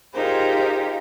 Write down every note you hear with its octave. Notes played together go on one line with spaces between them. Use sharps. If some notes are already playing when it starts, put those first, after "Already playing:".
D#4 F4 G4 G#4 A#4 C5